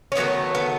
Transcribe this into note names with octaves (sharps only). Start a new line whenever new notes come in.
C#4
D#3 F#3 A3 B3
B3